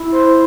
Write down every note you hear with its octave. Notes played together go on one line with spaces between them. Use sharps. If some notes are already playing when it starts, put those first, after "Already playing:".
Already playing: E4
C5